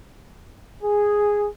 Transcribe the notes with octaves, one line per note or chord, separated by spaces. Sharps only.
G#4